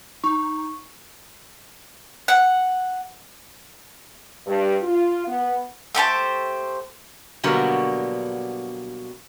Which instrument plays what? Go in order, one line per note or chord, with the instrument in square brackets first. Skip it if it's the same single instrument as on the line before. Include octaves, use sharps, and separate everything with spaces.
[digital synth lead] D#4 [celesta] C#6
[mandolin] F#5
[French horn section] G2
F4
B3
[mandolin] A3 G4 C5 A5
[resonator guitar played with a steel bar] B2 D3 F#3 G3 A#3 B3